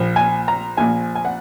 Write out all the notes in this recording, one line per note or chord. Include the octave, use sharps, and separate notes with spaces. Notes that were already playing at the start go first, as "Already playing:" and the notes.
Already playing: A#1 A#2 F3
G#5
A#5
A#1 A#2 F3 G#5
G#5
F#5